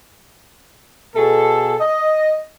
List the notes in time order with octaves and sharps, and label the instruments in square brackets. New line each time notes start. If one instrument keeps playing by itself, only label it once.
[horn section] B2 G#4 A4
D#5